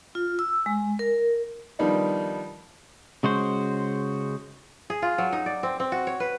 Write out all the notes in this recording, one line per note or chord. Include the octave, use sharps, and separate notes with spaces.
F4
E6
G#3
A#4
D#3 F3 G3 B3 D4 D#4
C#3 G#3 F#4 C5
G#4
F4
F#3
D#4
D5
C4
C4
F#4
C#5
B4